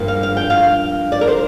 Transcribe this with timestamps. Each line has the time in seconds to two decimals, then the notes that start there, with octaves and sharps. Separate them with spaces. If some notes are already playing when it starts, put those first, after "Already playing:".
Already playing: G2 F3 A#3
0.08 F5
0.23 F5
0.37 G5
0.50 F5
1.12 D5
1.21 A#4
1.27 C5